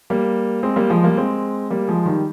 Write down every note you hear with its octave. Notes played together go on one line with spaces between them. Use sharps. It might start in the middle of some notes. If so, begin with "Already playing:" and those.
G3 A#3
G#3 C4
G3 A#3
F3 G#3
G3 A#3
G#3 C4
G3 A#3
F3 G#3
D#3 G3